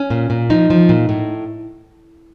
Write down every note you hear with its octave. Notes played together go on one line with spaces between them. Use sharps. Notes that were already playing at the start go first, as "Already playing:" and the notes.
Already playing: C#4
A#2
A#2
F3 D#4
F3
A#2
A2